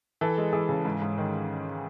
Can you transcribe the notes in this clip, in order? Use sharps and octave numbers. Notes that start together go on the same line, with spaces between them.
E3 A4
G#3
E3 G#4
C#3
G#2
G#2
D#3